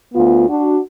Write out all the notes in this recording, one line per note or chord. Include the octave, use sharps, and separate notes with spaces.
D2 B3 F4
D4 F#4